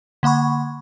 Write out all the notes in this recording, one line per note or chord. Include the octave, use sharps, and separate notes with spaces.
D3 A#3 F#5 B5 C#6